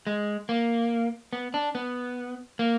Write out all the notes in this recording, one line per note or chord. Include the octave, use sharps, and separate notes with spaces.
G#3
A#3
B3
D4
B3
A#3